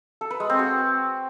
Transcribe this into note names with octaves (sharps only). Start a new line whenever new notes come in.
A4
B4
G#3
C4
F#4